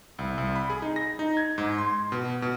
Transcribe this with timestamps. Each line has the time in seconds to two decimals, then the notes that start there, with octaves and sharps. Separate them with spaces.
0.19 C2
0.38 C2
0.56 B5
0.70 G#4
0.82 D#4
0.96 A#6
1.19 D#4
1.37 G#6
1.58 G#2
1.78 C6
2.12 B2
2.42 B2